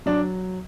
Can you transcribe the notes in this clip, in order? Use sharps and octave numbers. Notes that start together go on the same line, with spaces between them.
F#3 D4